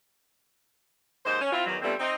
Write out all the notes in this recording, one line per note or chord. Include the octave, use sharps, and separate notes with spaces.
D#2 G#2 D#4 C5
C#4
C4 E4 F4
E2 D#3 F#3
D3 F3 G3 A3 B3 C4
C4 D#4